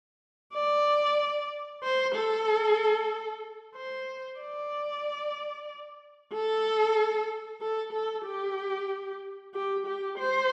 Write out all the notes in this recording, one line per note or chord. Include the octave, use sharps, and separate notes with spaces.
D5
C5
A4
C5
D5
A4
A4
A4
G4
G4
G4
C5